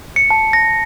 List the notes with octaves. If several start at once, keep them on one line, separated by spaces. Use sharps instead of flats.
C#7
A5
A#6